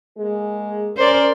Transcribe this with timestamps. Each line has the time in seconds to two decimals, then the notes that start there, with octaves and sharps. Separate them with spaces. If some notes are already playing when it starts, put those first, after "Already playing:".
0.18 G#3 A#3 G#4
0.97 C#4 A#4 C5 D5